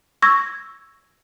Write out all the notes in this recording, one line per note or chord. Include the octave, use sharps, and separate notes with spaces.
C#6 E6 G#6 A#6